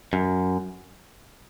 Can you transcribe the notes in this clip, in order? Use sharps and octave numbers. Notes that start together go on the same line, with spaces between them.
F#2